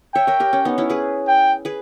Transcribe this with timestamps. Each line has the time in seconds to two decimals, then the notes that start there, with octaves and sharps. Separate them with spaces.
0.14 C#5 E5 G5
0.27 A#4 C#5
0.40 G4 A#4
0.53 C#4
0.65 B3 D#4
0.78 C#4 E4
0.90 G#4 B4
1.28 G5
1.65 G#4 B4